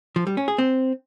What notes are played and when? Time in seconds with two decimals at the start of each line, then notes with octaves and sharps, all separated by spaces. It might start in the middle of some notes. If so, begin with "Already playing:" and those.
0.16 F3
0.27 G3
0.37 C#4
0.48 G#4
0.58 C4